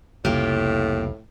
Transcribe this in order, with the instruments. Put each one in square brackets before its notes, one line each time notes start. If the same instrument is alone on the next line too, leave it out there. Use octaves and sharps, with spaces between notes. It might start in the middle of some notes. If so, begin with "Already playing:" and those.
[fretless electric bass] F1 C2 C#3 [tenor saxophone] A2 [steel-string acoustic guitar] A#3 F4 G4